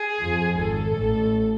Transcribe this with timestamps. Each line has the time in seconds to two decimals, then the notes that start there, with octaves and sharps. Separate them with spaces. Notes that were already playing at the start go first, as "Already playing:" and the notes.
Already playing: G#4
0.21 F2 F3
0.57 G#1 G#2 A4
0.95 A1 A2